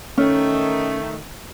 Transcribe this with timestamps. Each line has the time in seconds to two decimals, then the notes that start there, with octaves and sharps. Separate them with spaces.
0.17 D#3 A3 C#4